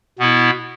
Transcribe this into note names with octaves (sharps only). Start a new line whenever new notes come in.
B2 B3 E4